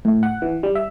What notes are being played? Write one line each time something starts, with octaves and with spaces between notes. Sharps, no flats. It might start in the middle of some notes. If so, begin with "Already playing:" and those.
A2
F#5
E3
G3
E5